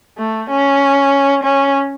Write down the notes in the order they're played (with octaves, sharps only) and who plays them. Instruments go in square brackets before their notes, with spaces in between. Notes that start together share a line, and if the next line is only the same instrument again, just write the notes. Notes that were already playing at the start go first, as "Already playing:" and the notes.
[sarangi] A3
C#4
C#4